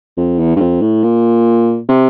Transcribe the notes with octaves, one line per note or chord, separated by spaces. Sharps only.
F2
E2
G2
F2
A2
A#2
C3